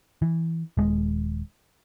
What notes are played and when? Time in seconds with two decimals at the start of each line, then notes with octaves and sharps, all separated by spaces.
0.22 E3
0.77 D#1 G#3